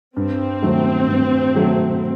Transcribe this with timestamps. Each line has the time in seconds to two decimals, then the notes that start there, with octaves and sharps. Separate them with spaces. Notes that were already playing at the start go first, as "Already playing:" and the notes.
0.17 G2 C4
0.63 D#3 F#3 A3
1.08 G2
1.54 D#3 F#3 A3